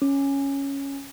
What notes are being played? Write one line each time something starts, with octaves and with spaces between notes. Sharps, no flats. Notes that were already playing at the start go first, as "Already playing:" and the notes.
C#4